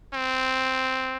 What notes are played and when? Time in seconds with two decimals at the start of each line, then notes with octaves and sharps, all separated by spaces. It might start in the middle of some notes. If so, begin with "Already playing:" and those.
0.14 C4